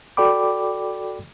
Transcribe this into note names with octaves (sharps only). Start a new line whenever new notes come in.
F#4 A4 D5 G5 B5 D6